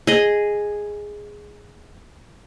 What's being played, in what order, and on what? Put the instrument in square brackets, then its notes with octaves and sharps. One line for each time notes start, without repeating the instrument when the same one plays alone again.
[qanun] G#4 D#5